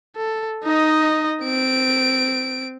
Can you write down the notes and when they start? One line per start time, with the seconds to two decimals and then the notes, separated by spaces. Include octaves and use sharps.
0.16 A4
0.64 D#4 D#5
1.43 C4 D7